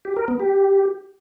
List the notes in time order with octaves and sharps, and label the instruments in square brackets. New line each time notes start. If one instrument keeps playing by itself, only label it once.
[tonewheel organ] G4
A#4
B3
G4